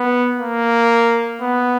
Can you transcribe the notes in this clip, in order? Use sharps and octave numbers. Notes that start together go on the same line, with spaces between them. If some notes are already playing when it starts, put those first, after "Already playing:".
Already playing: B3
A#3
B3